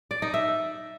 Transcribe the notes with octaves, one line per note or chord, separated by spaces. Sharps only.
D5
D#4
E5